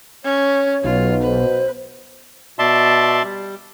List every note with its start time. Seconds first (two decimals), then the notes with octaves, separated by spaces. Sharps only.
0.24 C#4 C#5
0.84 B1 B2 F4
1.23 B4 C5
2.59 B2 D5 E5 A5 C6
3.24 G3